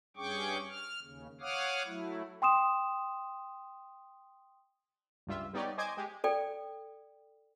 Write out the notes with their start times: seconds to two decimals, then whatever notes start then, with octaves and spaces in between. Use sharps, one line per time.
0.17 G2 C#4 G#4 G5 C#6 D6
0.69 F6
1.02 D#2 C#3
1.41 C#5 F5 F#5 D6 D#6 F6
1.86 F#3 A3 E4
2.42 G5 C6 D#6 E7
5.27 C#2 G2 G3 F4 E5
5.53 G3 B3 D#4 G4 C#5 D5
5.78 C5 D#5 G#5 D6 G#6
5.97 G#3 G4
6.24 A4 D5 G5